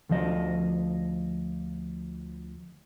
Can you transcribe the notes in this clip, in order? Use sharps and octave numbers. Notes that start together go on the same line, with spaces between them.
D2 F3 D#5